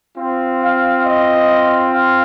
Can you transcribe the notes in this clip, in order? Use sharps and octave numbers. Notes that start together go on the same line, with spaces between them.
C4 F4
F5
D#5
F5